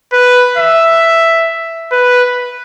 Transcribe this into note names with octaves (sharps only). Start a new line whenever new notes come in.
B4
E5
B4